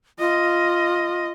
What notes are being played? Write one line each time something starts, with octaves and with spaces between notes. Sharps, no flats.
F4 D#5